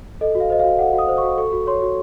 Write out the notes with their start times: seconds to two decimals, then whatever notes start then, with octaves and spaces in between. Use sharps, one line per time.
0.21 A4 D#5
0.35 F#4
0.40 F5
0.50 C5 D#5
0.59 F#4 F5
0.79 A4 F#5
0.93 F#4
0.98 D#6
1.08 C5
1.18 F#4 C#6
1.37 A4 C#6
1.52 F#4
1.67 C#5 C6
1.82 F#4